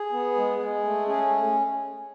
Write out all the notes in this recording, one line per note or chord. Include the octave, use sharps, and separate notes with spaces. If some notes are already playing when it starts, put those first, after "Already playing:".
Already playing: G#4
B3
G#3
G#3
A3
C#4 G#4